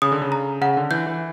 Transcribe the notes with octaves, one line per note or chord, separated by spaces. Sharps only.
C#3 D#6
D3
C#3
A#5
C#3 F#5
D3
E3 G6
E3